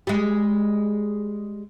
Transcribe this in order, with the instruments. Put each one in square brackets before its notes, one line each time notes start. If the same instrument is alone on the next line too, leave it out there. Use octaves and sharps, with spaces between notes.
[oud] G3 G#3